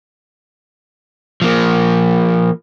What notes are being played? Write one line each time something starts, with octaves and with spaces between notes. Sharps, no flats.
F3 A#3